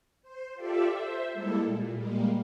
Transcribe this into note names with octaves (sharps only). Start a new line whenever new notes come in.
C5
F4 G4 A4 D5 E5
C5 E5
G3 G#3 A#3 E4 A4
A#2
G3 G#3 A#3